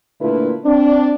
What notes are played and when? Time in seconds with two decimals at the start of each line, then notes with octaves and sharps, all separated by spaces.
0.21 A#2 D3 A3 E4 F4 B4
0.65 C4 D4